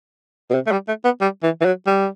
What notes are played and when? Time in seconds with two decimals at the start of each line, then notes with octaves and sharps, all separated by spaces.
0.50 B2
0.55 C3
0.67 A3
0.72 G3
0.88 A3
1.05 B3
1.21 G3
1.43 E3
1.61 E3
1.65 F#3
1.87 G3